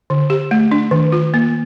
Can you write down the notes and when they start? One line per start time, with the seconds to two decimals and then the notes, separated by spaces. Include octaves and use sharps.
0.10 D3
0.30 G4
0.51 A3
0.71 D4
0.91 D#3
1.12 F4
1.34 A#3